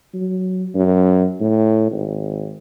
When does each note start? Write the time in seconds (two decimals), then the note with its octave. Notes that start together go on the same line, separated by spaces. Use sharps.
0.14 F#3
0.75 F#2
1.40 A2
1.91 G#1